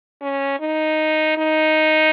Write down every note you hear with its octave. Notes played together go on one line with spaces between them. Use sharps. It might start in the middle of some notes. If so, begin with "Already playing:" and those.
C#4
D#4
D#4